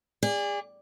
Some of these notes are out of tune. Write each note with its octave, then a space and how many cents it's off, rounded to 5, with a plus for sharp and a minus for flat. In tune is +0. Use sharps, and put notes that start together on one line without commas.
G#4 -35 D5 +0